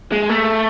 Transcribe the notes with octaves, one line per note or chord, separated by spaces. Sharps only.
G#3
A3